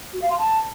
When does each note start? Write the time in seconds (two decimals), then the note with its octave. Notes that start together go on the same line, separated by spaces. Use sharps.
0.13 F#4
0.21 F5
0.29 C6
0.38 A5